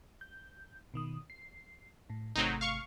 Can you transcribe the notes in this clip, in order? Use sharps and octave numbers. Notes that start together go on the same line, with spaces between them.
G6
B2 D#3 D#6
C7
A2
G#1 C3 F#3 A3 C4 D#4
F5 C#6